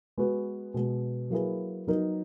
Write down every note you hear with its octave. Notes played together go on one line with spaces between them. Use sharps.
G#3 B3 F#4 B4
B2 G#3 B3
F#3 A#3 E4 G#4 B4
F#3 B3 D#4 A#4